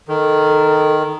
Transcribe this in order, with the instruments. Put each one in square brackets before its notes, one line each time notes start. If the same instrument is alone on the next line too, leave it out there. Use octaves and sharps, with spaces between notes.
[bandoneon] D#3 [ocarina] A4